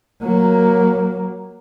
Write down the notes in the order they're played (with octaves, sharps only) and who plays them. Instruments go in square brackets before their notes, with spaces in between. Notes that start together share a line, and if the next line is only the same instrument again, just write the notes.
[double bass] F#3 A#3